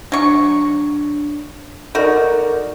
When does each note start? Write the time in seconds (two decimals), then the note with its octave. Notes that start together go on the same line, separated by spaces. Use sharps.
0.12 F#3 D4 C#6
1.95 D#4 F#4 A4 A#4 D5